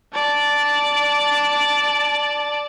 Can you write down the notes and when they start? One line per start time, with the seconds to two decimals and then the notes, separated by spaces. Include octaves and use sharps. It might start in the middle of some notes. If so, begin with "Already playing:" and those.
0.14 D5 A5